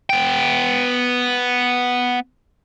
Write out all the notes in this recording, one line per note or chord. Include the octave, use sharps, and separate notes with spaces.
B3 G5